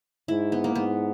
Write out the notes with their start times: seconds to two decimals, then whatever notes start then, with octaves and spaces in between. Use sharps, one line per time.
0.28 G#2 E4
0.52 B3
0.64 A#3
0.75 G#2 B3